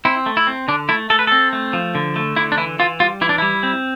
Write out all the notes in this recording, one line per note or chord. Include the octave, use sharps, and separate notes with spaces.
C4 E4
A3
E4
C4
D3 D4
A3 E4
A3 A4
B4
C4 A4
A3
F3
D3
A3
D3 E4
D4
E3 E4
E3 F4
G3 F4
E3 E4
D4
G3 E4
C4